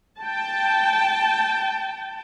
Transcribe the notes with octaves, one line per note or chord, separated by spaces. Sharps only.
G5 A5